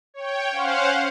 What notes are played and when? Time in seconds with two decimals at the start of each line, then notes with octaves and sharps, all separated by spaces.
0.14 C#5 G5
0.51 C#4 C5 F5 F#5